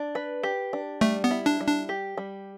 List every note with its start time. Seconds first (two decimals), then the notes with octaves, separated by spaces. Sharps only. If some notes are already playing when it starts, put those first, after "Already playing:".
Already playing: D4
0.15 B4
0.43 G4
0.73 D4
1.01 G3 A3
1.24 B3
1.31 E4
1.46 D4
1.60 G3
1.67 D4
1.89 G4
2.17 G3